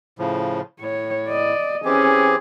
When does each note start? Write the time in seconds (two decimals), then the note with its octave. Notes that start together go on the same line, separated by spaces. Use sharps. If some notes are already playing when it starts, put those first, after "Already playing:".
0.19 A2 C#3 F3
0.81 A2 C#5
1.28 D5 D#5
1.85 E3 C4 C#4 G4 G#4